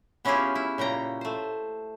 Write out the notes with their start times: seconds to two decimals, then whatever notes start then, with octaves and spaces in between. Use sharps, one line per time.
0.25 B3 C#4 E4 F4 G4 G#4
0.55 E4
0.78 A#2 C#3 G5 A#5
1.21 A3 C5